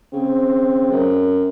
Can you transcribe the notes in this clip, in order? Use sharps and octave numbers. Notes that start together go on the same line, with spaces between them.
C#3 C4
F#2